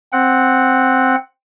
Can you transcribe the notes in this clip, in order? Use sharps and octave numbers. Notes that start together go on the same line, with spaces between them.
C4 F#5